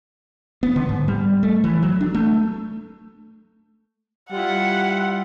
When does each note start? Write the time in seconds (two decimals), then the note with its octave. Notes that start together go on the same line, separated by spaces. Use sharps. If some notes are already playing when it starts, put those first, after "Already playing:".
0.63 B3
0.76 D3
0.89 G#2
1.08 G3
1.43 A3
1.64 E3
1.83 F#3
2.01 D4
2.15 A3
4.31 G3 E4 F4 F#5